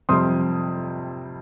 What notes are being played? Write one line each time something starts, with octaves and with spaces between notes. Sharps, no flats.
F2 C3 G3 C4 C6 D#6